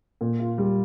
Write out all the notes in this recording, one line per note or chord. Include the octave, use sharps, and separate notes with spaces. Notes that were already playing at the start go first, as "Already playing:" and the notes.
A#2
F4
G3